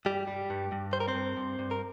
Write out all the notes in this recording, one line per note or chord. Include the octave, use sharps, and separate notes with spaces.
G2 G3 G4
G3
G2
G2
G3 C5
A#4
C4 C5
G2
G2
G2
A#4